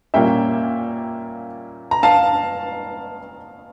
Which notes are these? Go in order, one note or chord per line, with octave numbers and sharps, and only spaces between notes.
A#2 G3 A#3 C#4 E5 G5
A#5
F5 A5